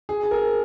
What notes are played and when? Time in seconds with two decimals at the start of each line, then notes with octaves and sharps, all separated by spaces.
0.09 G#4
0.23 G#4
0.31 A#4